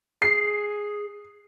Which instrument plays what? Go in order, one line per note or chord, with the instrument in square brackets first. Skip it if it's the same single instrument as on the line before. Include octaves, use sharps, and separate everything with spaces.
[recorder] G#4 [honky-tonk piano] C7